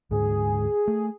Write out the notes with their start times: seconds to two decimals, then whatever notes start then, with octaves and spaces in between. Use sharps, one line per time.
0.11 D2 G#2 G#3 G#4
0.88 A3